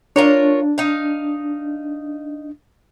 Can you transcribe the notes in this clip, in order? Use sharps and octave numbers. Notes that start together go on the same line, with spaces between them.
D4 F4 A#4 C#5
D#4 F5